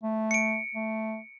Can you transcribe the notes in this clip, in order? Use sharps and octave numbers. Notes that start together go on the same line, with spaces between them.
A3
C#7 D7
A3